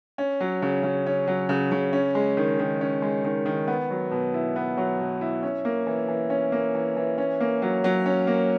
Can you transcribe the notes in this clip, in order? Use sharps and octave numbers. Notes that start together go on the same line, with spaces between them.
C#4
F#3
C#3
C#3
C#4
F#3
C#3
C#3
C#4
G#3
D#3
D#3
C#4
G#3
D#3
D#3
B3
F#3
B2
E4
B3
F#3
B2
E4
C#4
A#3
E3
E3
C#4
A#3
E3
E3
C#4
A#3
F#3
F#3
C#4
A#3